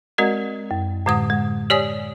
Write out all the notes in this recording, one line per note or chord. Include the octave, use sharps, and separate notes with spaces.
G#3 C4 F#4 A#4 D5 D#5
F#2
A2 D3 G#3 D#6
G#3
G4 C#5 D5 G#5 D#6